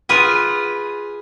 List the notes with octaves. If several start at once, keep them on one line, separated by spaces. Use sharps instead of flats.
F4 G#4 B4 G#5